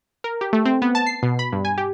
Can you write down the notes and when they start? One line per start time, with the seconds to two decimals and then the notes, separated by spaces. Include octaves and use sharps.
0.24 A#4
0.41 G4
0.53 A3
0.65 C4
0.82 B3
0.95 A5
1.06 C7
1.23 B2
1.39 B5
1.53 G2
1.65 G#5
1.78 G4